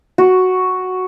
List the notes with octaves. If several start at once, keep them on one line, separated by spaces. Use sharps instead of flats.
F#4